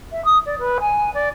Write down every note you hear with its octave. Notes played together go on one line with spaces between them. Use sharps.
E5
D#6
D5
B4
G#5
D5